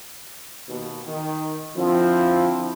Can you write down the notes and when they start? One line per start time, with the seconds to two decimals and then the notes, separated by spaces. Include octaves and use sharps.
0.69 D#2 B2
1.07 D#3
1.76 D3 F3 C4 E4